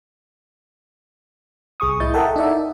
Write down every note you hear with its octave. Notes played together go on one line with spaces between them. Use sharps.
C2 G#4 C#6 D#6
A2 E4 D#5 G6 A6
A4 A#4 E5 F#5 G5 A5
D#4 D5 E5